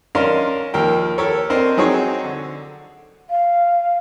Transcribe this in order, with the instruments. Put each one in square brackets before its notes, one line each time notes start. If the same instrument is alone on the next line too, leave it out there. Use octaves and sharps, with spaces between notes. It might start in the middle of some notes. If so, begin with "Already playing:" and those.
[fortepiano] C#4 D4 A#4 D#5 F5 C6
D#2 F3 A#4 G5
G4 A4 A#4 C#5
C4 D4 A#4 C5 D#5
F#3 C4 D#4 G#4 C5 C#5
D3
[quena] F5